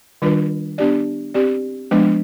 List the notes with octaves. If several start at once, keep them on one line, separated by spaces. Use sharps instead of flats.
D#3 G3 D4 F4 B4
B3 D4 G4 D5
C4 G4 D5
F3 G#3 B3 D4